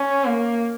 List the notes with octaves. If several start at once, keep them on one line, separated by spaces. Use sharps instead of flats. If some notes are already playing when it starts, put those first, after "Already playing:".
Already playing: C#4
A#3